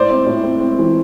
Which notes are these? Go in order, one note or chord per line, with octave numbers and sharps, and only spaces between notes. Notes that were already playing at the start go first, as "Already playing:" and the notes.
Already playing: A2 C5 D5
C4
A2
C4
C4
E3